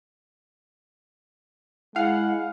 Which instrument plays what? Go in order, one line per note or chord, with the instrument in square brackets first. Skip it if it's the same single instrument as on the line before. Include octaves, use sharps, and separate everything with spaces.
[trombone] G#3 [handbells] E4 G#5 [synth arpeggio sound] F5 [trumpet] F#5